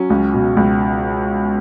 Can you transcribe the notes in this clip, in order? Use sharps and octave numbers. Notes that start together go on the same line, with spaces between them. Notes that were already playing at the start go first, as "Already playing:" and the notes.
Already playing: F#3 C#4
C#2
B2
C#2